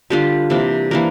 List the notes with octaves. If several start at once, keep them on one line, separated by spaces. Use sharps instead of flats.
D3 G3 D4 F4 G4
C3 E3 A#3 D4
E3 A#3 D4 A#4